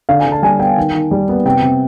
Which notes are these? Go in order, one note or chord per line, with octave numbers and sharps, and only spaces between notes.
D3 F5
G#5
D3
A5
G3 G#5
B3 G5
D#3
D#3
G3
B3
C3 G5
C3